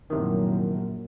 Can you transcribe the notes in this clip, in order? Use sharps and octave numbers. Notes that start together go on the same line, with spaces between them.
A#1 F#2 A2 C3 D#3